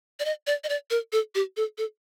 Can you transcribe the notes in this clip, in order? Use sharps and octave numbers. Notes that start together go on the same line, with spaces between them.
D5
D#5
D5
D#5
D5
A#4
A4
G4
A4
A4